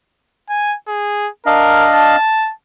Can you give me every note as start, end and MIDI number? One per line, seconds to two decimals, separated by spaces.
0.50 0.76 80
0.88 1.29 68
1.46 2.16 62
1.46 1.86 70
1.46 2.16 75
1.46 2.16 77
1.92 2.52 81